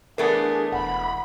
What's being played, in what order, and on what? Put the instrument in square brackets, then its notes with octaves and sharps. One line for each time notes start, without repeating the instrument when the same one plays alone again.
[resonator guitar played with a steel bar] E3 A3 B3 [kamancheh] D4 G#4 [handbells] A#4
[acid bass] E1 [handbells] F#5 [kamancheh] B5